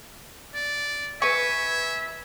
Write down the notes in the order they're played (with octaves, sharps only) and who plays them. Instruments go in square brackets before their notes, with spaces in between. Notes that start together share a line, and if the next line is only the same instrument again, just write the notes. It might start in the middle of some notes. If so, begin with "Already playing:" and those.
[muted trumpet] D5
[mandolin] B4 C#6 [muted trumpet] E5 [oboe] G#5